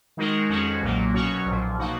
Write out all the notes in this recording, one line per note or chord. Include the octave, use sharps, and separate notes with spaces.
D#3 G#3 D#4 F#4 A#4
F2 D#3 G#3 C#4 F#4
B1 A#2 F#3 A#3
B2 F#3 C#4 F#4 C#5
B1 A#2 F3
B2 A#3 D#4 F#4